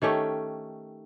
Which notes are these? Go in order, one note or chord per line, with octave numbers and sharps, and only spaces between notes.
D#3 A3 C#4 G4